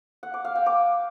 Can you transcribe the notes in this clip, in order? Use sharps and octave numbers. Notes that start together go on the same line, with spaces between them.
F#5
D6
F5
G5
D6